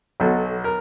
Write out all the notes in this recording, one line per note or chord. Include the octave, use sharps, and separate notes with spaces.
B1 B2 F#3 A4
A#4